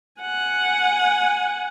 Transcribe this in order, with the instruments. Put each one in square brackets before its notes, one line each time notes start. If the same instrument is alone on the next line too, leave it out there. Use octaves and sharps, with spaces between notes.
[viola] F#5 G#5